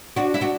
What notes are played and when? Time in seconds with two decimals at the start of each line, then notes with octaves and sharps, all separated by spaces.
0.16 D4 F#4
0.34 E4
0.41 D4 F#4